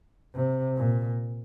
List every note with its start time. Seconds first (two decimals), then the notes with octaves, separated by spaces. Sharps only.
0.35 C3
0.77 A#2